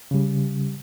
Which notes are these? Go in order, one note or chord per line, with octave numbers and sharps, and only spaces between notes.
C#3 G3